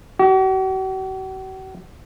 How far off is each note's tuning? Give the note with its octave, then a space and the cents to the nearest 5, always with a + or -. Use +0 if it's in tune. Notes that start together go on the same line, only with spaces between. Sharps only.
F#4 +45